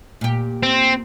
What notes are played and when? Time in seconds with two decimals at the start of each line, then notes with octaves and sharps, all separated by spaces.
0.21 A#2 G4
0.63 C4